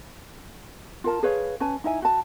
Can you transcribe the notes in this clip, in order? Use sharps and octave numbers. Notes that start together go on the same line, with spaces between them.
F4 A#4 A5
G#4 B4 C#5 F5
C#4 B4 G#5 A5
D#4 E4 E5 G#5
F#4 A5